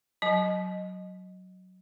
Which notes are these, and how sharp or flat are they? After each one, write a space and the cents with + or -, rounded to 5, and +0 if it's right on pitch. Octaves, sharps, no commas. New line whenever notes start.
F#3 +0 D#5 +0 A5 -45